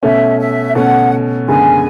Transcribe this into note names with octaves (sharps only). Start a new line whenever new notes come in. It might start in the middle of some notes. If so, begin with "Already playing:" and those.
B2 A3 C#4 E5
E5
B2 A3 C#4 F#5
F#1 F#2 D3 G#3 B3 G#5